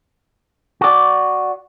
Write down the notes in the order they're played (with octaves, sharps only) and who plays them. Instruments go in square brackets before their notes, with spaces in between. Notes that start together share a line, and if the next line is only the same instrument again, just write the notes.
[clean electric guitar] F#4 D5